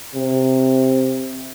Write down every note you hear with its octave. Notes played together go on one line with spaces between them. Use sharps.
C3